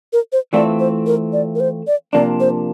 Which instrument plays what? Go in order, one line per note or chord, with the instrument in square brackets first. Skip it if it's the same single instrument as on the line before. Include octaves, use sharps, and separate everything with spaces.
[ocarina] A#4
C5
[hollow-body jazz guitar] E3 A3 C4 F4 [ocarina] D5
[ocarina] C5
A#4
D5
A#4
C5
D5
[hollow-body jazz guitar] C3 F3 A#3 D4 [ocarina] D5
[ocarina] C5